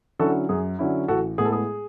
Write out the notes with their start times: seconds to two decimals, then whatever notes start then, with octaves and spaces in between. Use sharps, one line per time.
0.19 D3 F#3 C#4 E4 F#4 A4
0.49 F#2 G#4
0.79 D3 F#3 C#4 E4
1.08 A1 F#4 A4
1.38 A2 G#3 B3 G#4
1.45 A4
1.52 G#4